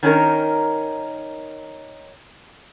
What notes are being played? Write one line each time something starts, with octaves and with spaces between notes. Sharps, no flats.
D#3 C#4 D#4 A#4